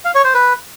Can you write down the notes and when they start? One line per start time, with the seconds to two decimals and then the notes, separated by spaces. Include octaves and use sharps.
0.05 F5
0.15 C#5
0.24 C5
0.34 B4